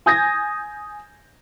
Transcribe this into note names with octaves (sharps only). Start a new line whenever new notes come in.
G#5 D#6 G6 G#6 A#6